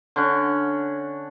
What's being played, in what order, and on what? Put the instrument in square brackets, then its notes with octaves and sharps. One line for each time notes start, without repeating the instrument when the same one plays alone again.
[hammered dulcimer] D3 C#4 F#5